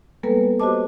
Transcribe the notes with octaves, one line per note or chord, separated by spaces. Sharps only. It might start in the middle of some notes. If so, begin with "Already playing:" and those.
G3 G#3 A#3 B3 A4 B4
F#4 G4 C5 D#5 A5 D6